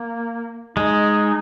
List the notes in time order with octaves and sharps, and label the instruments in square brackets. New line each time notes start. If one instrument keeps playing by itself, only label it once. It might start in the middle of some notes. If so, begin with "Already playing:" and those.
Already playing: [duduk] A#3
[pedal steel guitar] G#3 [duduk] D#4